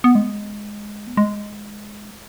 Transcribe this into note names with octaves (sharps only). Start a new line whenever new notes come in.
B3
G#3
B3
G#3